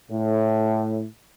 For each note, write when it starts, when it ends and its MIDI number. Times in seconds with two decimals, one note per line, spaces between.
0.10 1.05 45